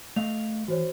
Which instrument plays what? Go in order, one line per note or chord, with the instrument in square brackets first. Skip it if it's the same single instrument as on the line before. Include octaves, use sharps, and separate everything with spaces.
[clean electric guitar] A3 D#5 F5 [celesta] F7
[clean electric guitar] E3 [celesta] F#4 C5 C#5